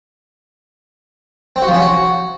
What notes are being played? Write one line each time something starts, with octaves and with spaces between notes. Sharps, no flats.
C4
F#4
F3
C#4
F#4